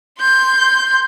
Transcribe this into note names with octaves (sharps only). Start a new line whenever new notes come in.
C6 G6